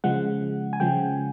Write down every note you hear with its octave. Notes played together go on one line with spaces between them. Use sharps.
C#3 F3 G#3 F#5
G#5
C#3 F3 G#3 G5